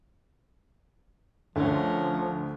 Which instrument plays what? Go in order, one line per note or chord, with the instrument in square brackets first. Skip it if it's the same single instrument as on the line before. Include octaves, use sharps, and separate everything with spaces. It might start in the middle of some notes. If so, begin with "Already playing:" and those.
[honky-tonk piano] D2 D3 [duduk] F3 [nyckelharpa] C#4 A#4